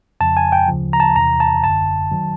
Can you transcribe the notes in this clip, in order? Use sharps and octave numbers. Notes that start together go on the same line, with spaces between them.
F2 C#3 F3 A5
G#5
G5
D2 C#3 F3
A#5
A5
E2 C3 E3 A#5
A5
G1 F#2 D3 A5
D#3 F#3